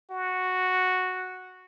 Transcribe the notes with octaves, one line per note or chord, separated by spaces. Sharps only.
F#4